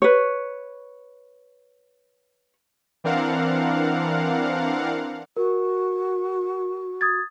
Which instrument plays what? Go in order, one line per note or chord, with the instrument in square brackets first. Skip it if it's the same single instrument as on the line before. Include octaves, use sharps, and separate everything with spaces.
[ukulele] B4 C#5
[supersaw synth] E3 C4 D4 A#4 F5 F#5
[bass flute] F#4 [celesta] A#4
[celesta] D#6 G#6 A6